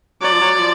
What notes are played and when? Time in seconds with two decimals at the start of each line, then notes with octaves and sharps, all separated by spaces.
0.22 F#3 D5
0.32 F3
0.41 F#3
0.54 F#3
0.59 F3